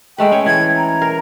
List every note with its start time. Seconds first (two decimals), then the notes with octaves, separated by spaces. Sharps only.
0.18 G#3 A3 B4 G5
0.32 C#4 C#5
0.46 E3 G#6
0.76 A#5
1.02 A#4